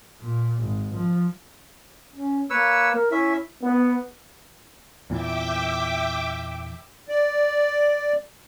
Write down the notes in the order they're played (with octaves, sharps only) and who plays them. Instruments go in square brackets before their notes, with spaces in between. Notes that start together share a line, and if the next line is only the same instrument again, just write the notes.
[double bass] A#2
G#1
F3
[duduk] C#4
[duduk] A#3 [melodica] B4 C#5 E6
[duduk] A#4
[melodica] C#4 E5 [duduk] E4
[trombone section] B3
[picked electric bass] E2 A#2 E3 [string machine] E5 G5 D6
[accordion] D5